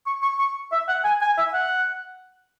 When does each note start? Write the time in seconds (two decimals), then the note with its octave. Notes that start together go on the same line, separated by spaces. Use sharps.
0.07 C#6
0.22 C#6
0.39 C#6
0.72 E5
0.88 F#5
1.04 G#5
1.21 G#5
1.38 E5
1.54 F#5